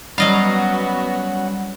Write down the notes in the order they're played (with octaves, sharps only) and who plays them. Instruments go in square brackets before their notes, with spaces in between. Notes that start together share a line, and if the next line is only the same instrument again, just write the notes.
[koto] F#3 D#5 F5 [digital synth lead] G3 [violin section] B3 F#4 [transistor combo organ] C#4 F#5